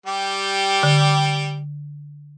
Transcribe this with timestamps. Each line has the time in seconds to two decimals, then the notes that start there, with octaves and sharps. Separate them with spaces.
0.06 G3 G4
0.83 D3